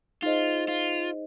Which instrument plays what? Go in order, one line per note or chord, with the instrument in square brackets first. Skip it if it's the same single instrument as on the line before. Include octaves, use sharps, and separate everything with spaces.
[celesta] D#4 G#4 C5 D#5 [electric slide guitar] F4
[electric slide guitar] F4